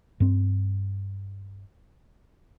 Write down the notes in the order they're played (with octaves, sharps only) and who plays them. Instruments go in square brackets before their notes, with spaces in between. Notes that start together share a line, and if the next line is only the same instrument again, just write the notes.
[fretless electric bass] G2 C4